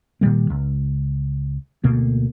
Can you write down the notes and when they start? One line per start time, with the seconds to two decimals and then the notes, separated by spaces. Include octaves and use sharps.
0.21 A#2 D#3 G3 A#3
0.50 C#2
1.84 D2 B2 A#3